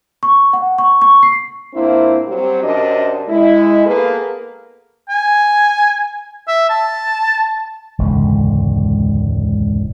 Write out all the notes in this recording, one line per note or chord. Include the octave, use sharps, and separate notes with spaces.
C#6
F#5
C#6
C#6
C7
A#2 A#3 C4 D4 E4
F#3 G3 C4 G4
F#2 C3 D4 A#4 D5 D#5
G#3 E4
A#3 B3 G#4 A4 B4
G#5
E5
A5
E1 C#2 G#2 D3